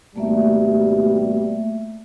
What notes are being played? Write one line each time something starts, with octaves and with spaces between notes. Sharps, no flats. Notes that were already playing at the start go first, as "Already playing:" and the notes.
G#1 B2 G3 A3 A#3 E5